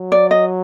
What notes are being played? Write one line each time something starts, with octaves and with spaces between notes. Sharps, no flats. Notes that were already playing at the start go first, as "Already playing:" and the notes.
Already playing: F#3
D5
D#5